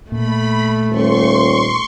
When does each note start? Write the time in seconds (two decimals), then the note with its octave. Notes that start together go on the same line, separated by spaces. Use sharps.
0.12 A#2 A3 B5
0.91 D#1 C6 C#6